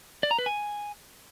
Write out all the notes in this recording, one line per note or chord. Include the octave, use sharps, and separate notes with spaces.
D5
A#5
B4
G#5